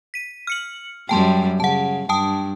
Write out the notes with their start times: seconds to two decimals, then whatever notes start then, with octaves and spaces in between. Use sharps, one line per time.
0.14 B6 D#7
0.47 F6 C#7 F#7
1.09 F#2 G3 G5 A5 C6
1.60 C#3 F#5 A5
2.09 G2 G5 A5 D#6